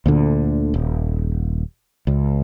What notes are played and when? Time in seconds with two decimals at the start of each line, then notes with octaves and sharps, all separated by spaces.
0.06 D2 A#2 D3
0.74 D#1
2.07 C#2